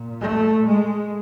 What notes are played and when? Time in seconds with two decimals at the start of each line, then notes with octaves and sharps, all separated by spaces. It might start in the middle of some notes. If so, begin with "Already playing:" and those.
Already playing: A#2
0.21 A3
0.66 G#3